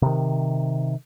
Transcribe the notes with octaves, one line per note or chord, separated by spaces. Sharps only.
C3 D#3